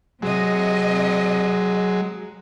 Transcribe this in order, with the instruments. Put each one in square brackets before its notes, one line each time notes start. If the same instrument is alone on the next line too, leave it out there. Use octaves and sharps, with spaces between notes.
[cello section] C3 D#5 [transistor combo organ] F#3 G#3